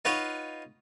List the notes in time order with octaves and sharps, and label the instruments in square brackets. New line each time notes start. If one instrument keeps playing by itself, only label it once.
[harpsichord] D#4 F4 B4 C#5 F#5